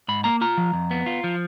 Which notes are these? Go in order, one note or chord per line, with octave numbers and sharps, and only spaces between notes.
G#2 B5
A#3 A#5
F4 A#5
F3
F2
B3
F4
F3